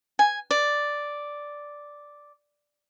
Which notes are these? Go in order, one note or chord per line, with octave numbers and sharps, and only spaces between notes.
G#5
D5